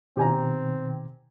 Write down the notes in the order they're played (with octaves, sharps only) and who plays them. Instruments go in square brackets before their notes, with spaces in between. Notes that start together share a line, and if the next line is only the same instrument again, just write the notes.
[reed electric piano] B2 D#3 [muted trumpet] C4 [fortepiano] G4 G#5 A#5